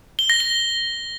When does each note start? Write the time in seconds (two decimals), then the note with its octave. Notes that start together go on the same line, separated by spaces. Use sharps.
0.19 G7
0.30 A#6
0.40 G7